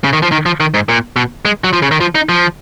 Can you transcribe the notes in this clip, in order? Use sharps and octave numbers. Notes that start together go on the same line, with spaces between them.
C#3
D#3
F3
D#3
F3
D#3
G#2
A#2
B2
G#3
F#3
F3
C#3
D#3
F3
D#4
F3